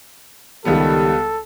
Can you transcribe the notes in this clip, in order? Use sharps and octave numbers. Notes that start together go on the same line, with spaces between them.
C#2 D#3 G3 B3 G4 A4